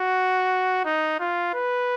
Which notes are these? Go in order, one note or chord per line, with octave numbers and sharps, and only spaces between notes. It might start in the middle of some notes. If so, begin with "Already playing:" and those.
Already playing: F#4
D#4
F4
B4